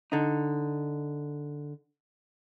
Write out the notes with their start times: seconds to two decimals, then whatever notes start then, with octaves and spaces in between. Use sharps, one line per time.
0.12 D3 D#4